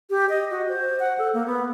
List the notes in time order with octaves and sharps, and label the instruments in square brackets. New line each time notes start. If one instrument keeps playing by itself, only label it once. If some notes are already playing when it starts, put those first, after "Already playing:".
[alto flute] G4
D#5
F#4
C5
F#5
A4
A#3
B3